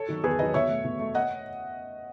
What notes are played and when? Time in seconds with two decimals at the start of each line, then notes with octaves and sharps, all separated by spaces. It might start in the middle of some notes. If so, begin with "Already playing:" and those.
Already playing: A4 C#5
0.08 D#3 F#3
0.24 E2 G#4 B4
0.38 D#3 F#3 B4 D#5
0.54 B2 C#5 E5
0.69 A3
0.84 B2
1.00 A3
1.15 D#5 F#5